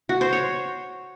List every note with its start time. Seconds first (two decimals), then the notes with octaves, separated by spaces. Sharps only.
0.09 F#4
0.21 C5
0.33 C#5